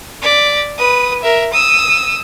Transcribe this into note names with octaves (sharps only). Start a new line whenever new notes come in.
D5 B6
B4 D#6
A#4 E5
D#6 E6